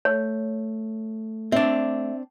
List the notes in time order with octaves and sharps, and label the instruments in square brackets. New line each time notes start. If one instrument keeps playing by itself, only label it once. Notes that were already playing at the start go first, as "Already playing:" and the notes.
[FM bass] A3 [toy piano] C#5
[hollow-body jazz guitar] C4 D4 [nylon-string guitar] D5 E5